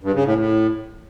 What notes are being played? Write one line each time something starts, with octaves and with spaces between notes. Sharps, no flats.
G2
C#3
A2
A2